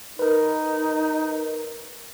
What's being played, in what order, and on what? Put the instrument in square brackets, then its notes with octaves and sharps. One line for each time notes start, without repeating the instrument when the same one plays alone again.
[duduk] D#4 [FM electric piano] A#4 B4